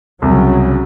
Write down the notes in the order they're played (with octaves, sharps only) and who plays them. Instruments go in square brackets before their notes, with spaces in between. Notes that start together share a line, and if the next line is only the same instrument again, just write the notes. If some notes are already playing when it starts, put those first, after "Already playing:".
[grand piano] C2 [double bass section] C#3 F#3